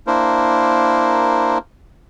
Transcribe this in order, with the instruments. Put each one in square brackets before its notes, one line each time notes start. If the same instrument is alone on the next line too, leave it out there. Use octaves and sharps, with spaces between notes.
[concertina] A#3 D4 E4 A#4 C5